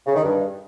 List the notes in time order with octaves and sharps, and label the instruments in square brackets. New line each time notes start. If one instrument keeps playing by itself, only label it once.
[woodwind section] C#3
D#3
G2